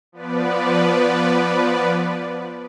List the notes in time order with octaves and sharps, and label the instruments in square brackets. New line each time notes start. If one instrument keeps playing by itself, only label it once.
[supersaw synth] F3 B3 B4 D5